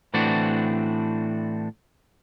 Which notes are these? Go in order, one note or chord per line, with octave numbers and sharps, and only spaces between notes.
A2 E3 A3 C4 D4 F#4